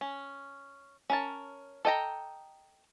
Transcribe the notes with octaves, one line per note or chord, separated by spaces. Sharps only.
C#4
C#4 A#4 A5
A4 D#5 G5 A#5